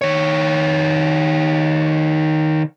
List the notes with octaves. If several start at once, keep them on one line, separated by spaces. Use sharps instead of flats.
D#3 C#5